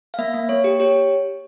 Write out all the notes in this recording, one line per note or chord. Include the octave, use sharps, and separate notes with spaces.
F5
A#3 E5
A#3
A#3 C#5
G4
G4 C#5